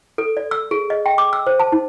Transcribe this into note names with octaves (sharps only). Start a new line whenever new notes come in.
A4
D5
E6
G#4
D#5
G5
D6
E6
C5
A5
D#4